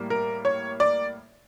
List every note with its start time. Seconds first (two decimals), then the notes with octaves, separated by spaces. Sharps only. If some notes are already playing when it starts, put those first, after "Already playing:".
Already playing: A2 G3 A#3
0.10 A#4
0.45 C#5
0.80 D5